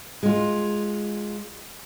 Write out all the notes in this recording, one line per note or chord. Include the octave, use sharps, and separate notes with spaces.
G#3 F4